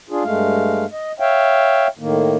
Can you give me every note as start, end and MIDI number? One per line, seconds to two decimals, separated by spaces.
0.10 0.23 62
0.10 0.23 65
0.10 0.23 68
0.23 0.85 43
0.23 0.85 56
0.23 0.85 57
0.23 0.85 77
0.92 1.12 75
1.20 1.87 73
1.20 1.87 76
1.20 1.87 77
1.20 1.87 79
1.99 2.37 45
1.99 2.37 51
1.99 2.37 58